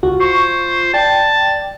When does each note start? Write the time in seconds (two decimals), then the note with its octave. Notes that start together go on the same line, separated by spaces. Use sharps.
0.03 C#2 F4 F#4
0.20 C5 C#6
0.94 D5 G5 A5